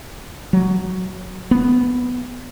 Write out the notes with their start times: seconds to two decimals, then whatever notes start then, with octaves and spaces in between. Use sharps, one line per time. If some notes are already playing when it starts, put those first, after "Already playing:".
0.53 F#3
1.51 B3